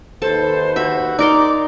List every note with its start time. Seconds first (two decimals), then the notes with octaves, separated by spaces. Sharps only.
0.22 D#2 A4 B4 C5 A5
0.76 F#4 E5
1.19 D#4 A#4 D5 C6 D6